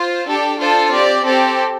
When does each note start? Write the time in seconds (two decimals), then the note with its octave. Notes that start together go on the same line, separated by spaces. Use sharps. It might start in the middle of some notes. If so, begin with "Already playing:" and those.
Already playing: F4 C5
0.27 D4 G4 A4
0.60 D4 F4 A4 C5
0.93 C4 G4 D5
1.26 C4 G4 A4